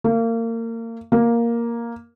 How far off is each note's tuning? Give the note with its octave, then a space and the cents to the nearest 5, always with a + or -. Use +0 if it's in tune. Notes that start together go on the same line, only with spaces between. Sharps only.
A#3 -30
A#3 +5